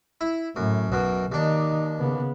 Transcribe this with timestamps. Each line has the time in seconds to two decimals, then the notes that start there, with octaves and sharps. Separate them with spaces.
0.21 E4
0.56 F#2 A2
0.92 B1 F#2 B2
1.32 D#2 D#3 D4 D#4
2.00 C#3 B3